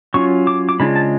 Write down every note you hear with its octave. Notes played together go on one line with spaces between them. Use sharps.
F#3 C#4 F4 C#6
D6
D6
C#3 G#3 D4 F4 B5
A5